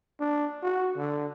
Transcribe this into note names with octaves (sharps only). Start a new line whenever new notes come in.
D4
F#4
D3